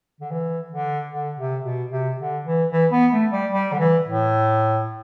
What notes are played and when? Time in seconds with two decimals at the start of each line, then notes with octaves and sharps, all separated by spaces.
0.21 D3
0.32 E3
0.71 D3
1.12 D3
1.38 C3
1.65 B2
1.91 C3
2.19 D3
2.46 E3
2.72 E3
2.92 B3
3.13 A3
3.32 G3
3.53 G3
3.72 D3
3.79 E3
4.07 A2